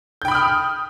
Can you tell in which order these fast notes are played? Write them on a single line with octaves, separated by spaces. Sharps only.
G6 G5 B5 D#6 F6